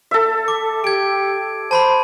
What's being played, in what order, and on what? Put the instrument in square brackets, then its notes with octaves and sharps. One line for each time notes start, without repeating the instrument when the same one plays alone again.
[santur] A4 E5
[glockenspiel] D6
[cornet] G4 [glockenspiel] G#6 D7
[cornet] C5 [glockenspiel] A5 B5 C6